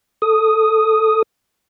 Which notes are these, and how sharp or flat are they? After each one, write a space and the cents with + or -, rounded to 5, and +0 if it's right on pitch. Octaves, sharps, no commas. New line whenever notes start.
A4 +0 D#6 +0